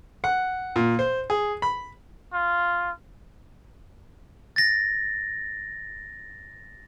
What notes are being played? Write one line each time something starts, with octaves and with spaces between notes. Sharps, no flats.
F#5
A#2
C5
G#4
B5
F4
A6 A#6